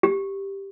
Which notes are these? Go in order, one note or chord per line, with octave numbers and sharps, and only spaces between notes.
G4